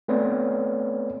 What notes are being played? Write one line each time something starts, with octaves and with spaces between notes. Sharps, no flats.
A3 B3 C4 B4 C#5 D5